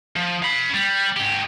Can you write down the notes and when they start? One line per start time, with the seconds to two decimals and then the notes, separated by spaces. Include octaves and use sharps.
0.16 F3
0.43 F5 B5
0.74 G3
1.17 G#2 G4